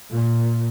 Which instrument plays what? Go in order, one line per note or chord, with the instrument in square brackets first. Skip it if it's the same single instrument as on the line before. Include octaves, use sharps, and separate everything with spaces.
[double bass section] A#2